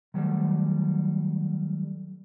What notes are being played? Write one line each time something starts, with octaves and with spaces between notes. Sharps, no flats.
D#3 F#3 G3 A3